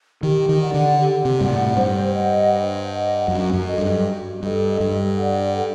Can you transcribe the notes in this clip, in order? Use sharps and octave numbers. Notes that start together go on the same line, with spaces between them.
D#3 G4
D#3
D5 F#5
D3
G4
C3
G2 D5 F#5
A2
G2 C5
D#5 F#5
C5
D#5 F#5
F#2 F#4
F#2
A4 D#5
G2
F#4
G2 A4 D#5
G2 A4
D5 F#5
A4